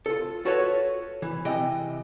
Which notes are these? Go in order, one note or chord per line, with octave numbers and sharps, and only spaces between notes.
F4 A4
F4 F#4 A4 B4 C#5
E3
C3 E3 D#5 G5